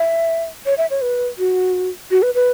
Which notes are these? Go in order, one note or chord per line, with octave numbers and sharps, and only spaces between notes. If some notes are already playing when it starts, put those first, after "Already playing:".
Already playing: E5
C#5
E5
C#5
B4
F#4
F#4
B4
B4